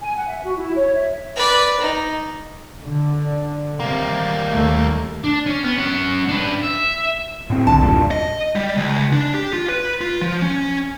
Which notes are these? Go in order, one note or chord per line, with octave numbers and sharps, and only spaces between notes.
G#5
F#5
E5
F#4
E4
C#5
E5
B4 D5
D#4
D3
C3 G3 A#3
D#2 A3
D4
C#4
B3
C#4 F#5
D4 B4
E5
A2 C4
C2 D3 A5
E2 G2 A#2 C#4
D#5
G3
C#2
D4
G4
F4
B4
F4
F3
C#4